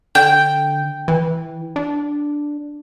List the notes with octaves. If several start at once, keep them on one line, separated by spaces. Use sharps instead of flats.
D3 G5
E3
D4